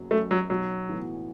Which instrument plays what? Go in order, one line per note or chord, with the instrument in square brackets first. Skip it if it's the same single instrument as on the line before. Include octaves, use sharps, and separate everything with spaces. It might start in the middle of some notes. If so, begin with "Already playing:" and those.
Already playing: [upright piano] F#1 F#2 F#3
[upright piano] F#2 F#3 [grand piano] A3
[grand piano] F#3
[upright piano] B1 [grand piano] F#3
[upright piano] A2 E3 B3 F#4